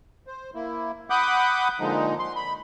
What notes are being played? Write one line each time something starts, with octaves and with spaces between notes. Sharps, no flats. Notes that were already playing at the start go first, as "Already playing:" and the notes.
C5
A#3 E4
F#5 B5 D6 D#6 F#6 G6
A#2 D3 F3 G#3 D#4
C6
B5